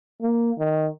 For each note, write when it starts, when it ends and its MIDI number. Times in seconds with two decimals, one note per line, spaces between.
0.22 0.52 58
0.59 0.88 51